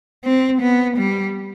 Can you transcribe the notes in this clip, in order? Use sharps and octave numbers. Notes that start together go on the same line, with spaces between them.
C4
B3
G3